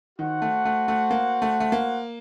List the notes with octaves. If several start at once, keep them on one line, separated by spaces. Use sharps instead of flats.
D#3 F#4 C5 F#5
A3
A3
A3
A#3
A3
A3
A#3